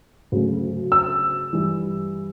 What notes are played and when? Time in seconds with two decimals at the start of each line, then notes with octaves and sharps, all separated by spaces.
0.32 D2 C#3 F#3 A3
0.92 E6
1.53 G2 E3 G3